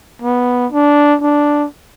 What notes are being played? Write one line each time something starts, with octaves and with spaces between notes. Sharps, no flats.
B3
D4
D4